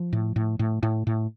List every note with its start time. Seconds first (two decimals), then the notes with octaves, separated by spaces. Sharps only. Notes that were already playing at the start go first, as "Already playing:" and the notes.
Already playing: F3
0.13 A2
0.36 A2
0.59 A2
0.83 A2
1.07 A2